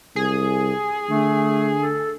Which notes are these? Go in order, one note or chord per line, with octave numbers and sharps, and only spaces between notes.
C2 G#4
D3 A3
A4